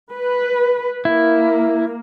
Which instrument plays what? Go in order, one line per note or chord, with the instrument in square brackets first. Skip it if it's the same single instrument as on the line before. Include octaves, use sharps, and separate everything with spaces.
[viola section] B4
[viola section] A#3 [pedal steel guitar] E4